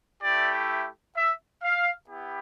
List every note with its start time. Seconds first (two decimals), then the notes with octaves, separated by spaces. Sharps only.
0.23 A3 E4 G4 D5
1.17 E5
1.64 F5
2.10 B3 E4 G4